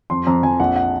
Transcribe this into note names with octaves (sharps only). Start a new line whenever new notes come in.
F2 C6
F2 A#5
F2 G#5
A#1 F#5
F#5